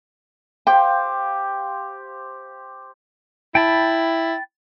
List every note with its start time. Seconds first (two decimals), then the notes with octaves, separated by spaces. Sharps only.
0.67 G4 C5 F5 G5
3.55 E4 G5 A5 B5